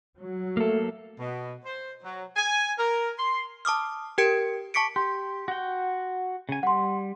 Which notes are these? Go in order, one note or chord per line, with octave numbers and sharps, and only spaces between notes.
F#3
A3 A#3 A4
B2
C5
F#3
G#5
A#4
C6
A5 D6 D#6 F6
G4 A#4 G5 G#6 C#7 D7
A5 C#6 D6 B6 C#7 D7
G4 C6
F#4 G5
C#3 G#5
G3 F#5 C6